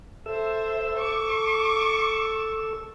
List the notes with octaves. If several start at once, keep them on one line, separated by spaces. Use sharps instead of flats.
A4 C5 E5 E6
C#6 D6